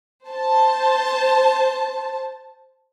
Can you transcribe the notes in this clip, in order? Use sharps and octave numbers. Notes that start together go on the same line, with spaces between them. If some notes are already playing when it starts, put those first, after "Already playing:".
C5 A5